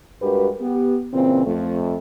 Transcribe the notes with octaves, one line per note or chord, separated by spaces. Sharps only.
G2 G#3 F#4 G4 A#4 B4
B3 G4
A#2 C#3 E3 C4
F2 A3